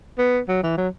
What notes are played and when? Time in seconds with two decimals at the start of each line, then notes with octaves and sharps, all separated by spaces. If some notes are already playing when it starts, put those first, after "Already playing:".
0.19 B3
0.49 F#3
0.63 E3
0.78 F#3